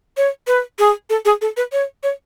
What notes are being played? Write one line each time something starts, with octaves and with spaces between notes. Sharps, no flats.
C#5
B4
G#4
A4
G#4
A4
B4
C#5
C#5